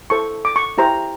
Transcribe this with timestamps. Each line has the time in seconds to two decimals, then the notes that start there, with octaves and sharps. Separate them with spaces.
0.10 E4 A4 C5 C#6
0.45 D6
0.56 C#6
0.78 E4 G4 C5 A#5